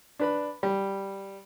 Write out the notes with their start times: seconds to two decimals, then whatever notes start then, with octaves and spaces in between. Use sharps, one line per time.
0.19 D4 B4 B5
0.63 G3